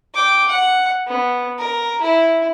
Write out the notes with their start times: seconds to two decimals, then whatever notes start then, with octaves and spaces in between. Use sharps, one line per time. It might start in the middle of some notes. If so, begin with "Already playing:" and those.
0.14 G5 D6
0.48 F#5
1.07 B3
1.58 A#4
2.02 E4